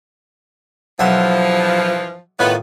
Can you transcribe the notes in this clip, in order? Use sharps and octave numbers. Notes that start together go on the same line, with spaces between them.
B1 G2 E3 F3 E5 F#5
A2 D#3 B3 F4